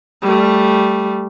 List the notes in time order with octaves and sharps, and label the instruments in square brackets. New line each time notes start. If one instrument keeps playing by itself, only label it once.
[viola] G3 A3